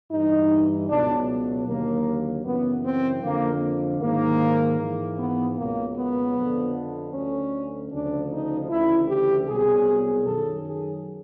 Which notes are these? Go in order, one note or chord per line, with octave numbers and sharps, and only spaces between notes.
G2 E3 D#4
C#2 B2 F#3 D4
D#2 D3 F#3 A#3
F#2 C#3 E3 B3
C4
F2 D3 F3 A#3
G#2 D#3 F#3 A#3
G#2 E3
B3
C#2 B2 F#3 A#3
B3
F2 D3 F3
D2 D3 F#3 C#4
D2 C#3 F3 D4
D#4
D2 C#3 E3 E4
G4
C2 B2 F#3 G#4
F#2 D#3 F#3 A4
G#4